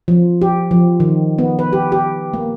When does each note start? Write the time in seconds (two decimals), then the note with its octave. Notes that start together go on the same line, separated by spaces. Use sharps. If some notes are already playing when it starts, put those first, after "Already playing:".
0.08 F3
0.42 G4
0.71 F3
1.00 D#3
1.39 B3
1.59 B4
1.73 G4
1.92 G4
2.34 A#3